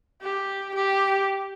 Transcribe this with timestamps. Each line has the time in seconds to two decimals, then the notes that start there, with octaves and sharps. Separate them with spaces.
0.22 G4
0.75 G4